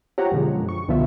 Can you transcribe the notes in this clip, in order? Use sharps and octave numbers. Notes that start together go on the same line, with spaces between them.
C4 F4 G4 C#5 F#5 A#5
F#2 B2 D3 F3 G#3
C#6
C2 B2 D3 F3 F4 E5